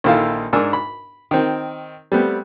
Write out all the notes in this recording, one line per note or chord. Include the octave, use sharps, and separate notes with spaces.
A#1 D#3 E4 F4 A4 F5
G#2 D4 A#4 G#5 E6
B5
D#3 C4
G3 A3 B3 C4